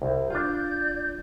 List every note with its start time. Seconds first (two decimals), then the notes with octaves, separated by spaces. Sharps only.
0.02 C2
0.30 D4 F4 D5 G6